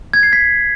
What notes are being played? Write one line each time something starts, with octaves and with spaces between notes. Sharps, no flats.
G#6
C7
B6